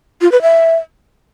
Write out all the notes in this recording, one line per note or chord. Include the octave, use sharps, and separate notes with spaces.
F4
B4
E5